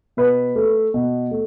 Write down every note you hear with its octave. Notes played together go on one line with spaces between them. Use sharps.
B2 B4
A3
B2
A3